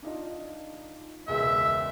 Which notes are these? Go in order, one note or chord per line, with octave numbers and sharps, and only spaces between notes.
D4 D#4 F4
E1 C#2 G#3 E5